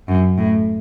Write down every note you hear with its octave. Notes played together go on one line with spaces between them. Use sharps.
F#2
A2